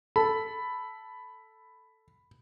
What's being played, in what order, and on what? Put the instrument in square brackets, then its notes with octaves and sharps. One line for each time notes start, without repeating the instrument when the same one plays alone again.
[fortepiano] A4 [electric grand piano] B5